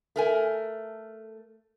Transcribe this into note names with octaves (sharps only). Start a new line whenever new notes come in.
A3 A#4 G#5